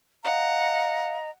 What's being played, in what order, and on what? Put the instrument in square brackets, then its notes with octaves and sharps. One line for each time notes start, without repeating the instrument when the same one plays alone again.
[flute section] D#5 A#5 [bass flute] F5 [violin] F#5